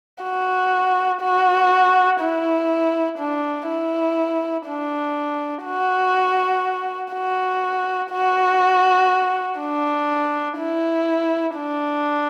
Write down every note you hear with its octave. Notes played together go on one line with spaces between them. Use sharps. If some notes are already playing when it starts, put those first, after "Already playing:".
F#4
F#4
E4
D4
E4
D4
F#4
F#4
F#4
D4
E4
D4